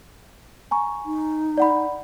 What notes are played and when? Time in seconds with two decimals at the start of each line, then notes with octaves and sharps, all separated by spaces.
0.71 G#5 A#5 C#6
1.06 D#4
1.58 D5 F#5 B5